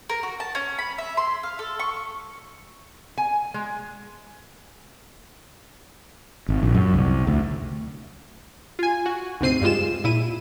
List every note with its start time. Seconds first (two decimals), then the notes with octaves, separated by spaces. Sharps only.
0.09 A#4
0.23 F#4
0.40 A5
0.55 C#4
0.79 B5
0.98 E5
1.17 C6
1.43 F5
1.59 A4
1.80 C#6
3.18 G#5
3.54 G#3
6.49 G#1
6.63 A#1
6.75 F#2
6.95 C2
7.27 D2
8.79 F4 G#5
9.06 F#4
9.41 D2 G#2 C3 C4 C7 D#7
9.62 G2 G3 G#3 F4 E7
10.04 A#2 E4 D#7